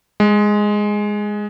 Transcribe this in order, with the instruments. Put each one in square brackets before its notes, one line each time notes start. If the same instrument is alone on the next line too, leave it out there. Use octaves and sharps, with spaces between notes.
[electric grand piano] G#3